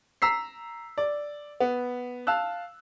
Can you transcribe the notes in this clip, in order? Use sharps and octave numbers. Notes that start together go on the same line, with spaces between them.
A#5 E6 B6 C7
D5
B3
F5 A5 E6 F#6